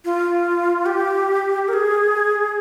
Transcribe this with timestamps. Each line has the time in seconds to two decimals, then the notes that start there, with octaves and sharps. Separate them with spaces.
0.05 F4
0.86 G4
1.68 A#4
1.73 G#4